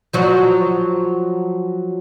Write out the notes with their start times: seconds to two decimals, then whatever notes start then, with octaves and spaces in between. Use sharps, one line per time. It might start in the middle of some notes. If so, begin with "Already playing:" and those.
0.13 F3 F#3 F#4